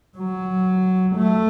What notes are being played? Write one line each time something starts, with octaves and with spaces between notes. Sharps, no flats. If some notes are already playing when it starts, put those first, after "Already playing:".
F#3
A3